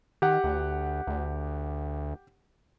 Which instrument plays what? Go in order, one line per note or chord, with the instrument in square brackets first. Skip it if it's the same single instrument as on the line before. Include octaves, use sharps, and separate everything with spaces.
[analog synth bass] D#3 [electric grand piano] G4 F#5
[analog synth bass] D2
D2